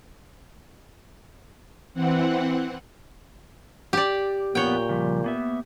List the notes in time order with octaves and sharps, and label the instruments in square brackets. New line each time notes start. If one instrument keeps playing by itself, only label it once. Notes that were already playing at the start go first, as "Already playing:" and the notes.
[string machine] E3 C4 F#5
[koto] G4 D5
[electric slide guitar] F2 B3 F#5 [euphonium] A#2 [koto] C#5 G5
[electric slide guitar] C#3 F3 G3
A#3 B3 E5